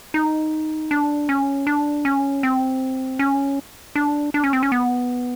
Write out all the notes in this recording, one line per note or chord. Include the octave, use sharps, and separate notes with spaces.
D#4
D4
C#4
D4
C#4
C4
C#4
D4
D4
C#4
C4
C#4
B3